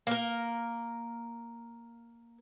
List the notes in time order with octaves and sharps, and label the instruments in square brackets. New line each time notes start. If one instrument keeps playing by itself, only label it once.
[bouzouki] A#3 A#4